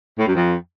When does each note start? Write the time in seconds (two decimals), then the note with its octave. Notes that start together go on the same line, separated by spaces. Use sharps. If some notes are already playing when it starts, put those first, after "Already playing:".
0.19 A2
0.27 F#2
0.35 F2